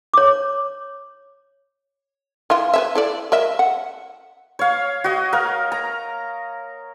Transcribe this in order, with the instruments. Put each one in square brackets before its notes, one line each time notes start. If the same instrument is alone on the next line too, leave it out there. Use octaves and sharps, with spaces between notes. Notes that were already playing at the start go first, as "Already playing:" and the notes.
[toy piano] C#5 D6
[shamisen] E3 E4 F4
B4 C#5 E5
E4 A4 D5
A#4 D#5 E5
F#5
[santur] C#5 F5
F#4 D#5
A#4 F5
A#5